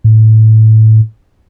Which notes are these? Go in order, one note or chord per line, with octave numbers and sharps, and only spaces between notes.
A2